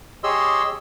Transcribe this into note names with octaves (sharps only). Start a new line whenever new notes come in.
G4 G#4 C#5 D#5 C6 E6